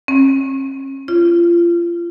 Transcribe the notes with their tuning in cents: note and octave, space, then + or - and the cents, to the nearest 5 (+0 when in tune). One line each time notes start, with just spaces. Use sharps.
C#4 -40
F4 -30